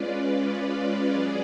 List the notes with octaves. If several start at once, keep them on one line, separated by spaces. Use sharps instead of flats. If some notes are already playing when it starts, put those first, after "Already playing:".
Already playing: G#3 C#4 F4 B4 D5
F#3 C#4 G#4 D5